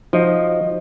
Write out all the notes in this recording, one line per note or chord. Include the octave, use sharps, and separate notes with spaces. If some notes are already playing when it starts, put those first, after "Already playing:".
F3 D#4 F#4 D#5